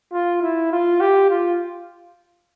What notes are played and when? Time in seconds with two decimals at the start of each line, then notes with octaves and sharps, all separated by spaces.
0.13 F4
0.41 E4
0.71 F4
1.00 G4
1.30 F4